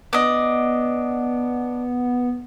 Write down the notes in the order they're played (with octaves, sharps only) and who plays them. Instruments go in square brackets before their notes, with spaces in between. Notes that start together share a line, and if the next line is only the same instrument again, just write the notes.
[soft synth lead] B3 [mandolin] D4 D#5